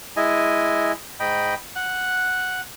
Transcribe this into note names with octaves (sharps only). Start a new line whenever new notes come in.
G#3 E4 D#5 G#5
G#2 D#5 G5 B5
F#5 F#6